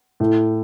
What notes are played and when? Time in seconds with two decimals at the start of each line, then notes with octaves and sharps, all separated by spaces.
0.20 A2